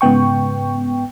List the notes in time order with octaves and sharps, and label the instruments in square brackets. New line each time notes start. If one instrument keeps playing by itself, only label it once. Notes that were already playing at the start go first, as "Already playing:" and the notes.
[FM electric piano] G#2 C#3 B3 G5 C#6